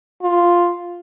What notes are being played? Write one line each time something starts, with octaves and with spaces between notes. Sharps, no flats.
F4